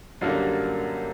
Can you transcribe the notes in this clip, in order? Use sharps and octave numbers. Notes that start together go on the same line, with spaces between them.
F#2 D3 G3 A#3